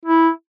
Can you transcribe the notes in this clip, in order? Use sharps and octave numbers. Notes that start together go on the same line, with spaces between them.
E4